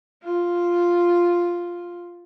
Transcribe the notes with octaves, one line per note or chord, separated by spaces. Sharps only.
F4